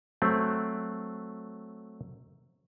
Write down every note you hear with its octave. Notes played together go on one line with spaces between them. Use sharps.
F#3 A3 C4